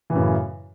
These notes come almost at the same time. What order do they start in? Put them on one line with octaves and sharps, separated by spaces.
E3 A2 F#2 C#3